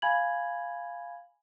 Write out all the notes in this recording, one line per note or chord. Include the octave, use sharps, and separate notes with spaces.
F5 G#5 B5 G#6 F#7